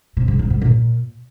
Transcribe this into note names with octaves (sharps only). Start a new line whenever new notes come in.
C3
G#2
C3
G#2
A#2